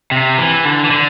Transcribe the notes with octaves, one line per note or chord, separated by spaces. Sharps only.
C3
E3
D3
E3
D3